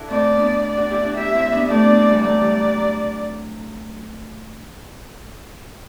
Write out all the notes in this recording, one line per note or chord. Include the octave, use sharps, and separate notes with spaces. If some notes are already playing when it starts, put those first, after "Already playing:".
Already playing: D4 E4 F#4 A4
A3 C4 D5
B3 D4
D5
D4 F#4
E4 G4
D4 F#4
E4 G4 E5
C4 E4
C4
B3 D4
A3 C4 D5
B3 D4
C4 E4
E3 G3
F#3 A3 D5
E3 G3
F#3
F#3